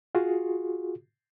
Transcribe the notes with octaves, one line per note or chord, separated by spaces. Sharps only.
F4 F#4 G#4